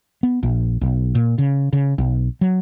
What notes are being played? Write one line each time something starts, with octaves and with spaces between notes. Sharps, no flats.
B3
A#1
B1
A#2
C#3
C#3
B1
F#3